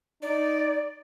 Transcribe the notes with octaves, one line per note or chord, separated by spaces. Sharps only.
D#4 D5